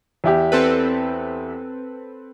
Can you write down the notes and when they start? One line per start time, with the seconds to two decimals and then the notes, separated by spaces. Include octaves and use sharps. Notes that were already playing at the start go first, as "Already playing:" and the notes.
0.24 E2 E4 G4
0.52 C4 A4 B4